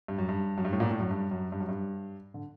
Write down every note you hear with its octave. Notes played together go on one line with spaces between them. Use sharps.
G2
F#2
G2
F#2
G2
A2
A#2
A2
F#2
G2
F#2
G2
F#2
G2
D3